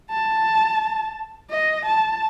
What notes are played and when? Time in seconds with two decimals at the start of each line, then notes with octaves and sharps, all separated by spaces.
0.11 A5
1.50 D#5
1.86 A5